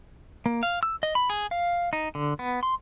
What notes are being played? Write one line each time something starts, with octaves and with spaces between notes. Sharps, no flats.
A#3
F5
E6
D#5
B5
G#4
F5
D#4
D3
B3
C6